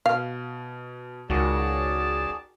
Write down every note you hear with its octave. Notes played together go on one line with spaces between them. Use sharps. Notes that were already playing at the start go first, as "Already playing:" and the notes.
B2 F5
C#2 D#3 F#4 G#4 D5 A5